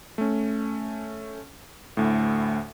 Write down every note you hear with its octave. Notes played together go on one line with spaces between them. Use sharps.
A3 C#4
D2 A2